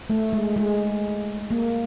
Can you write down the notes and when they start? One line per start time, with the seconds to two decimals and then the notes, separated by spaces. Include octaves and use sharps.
0.10 A3
0.33 G#3
0.56 G#3
1.51 A#3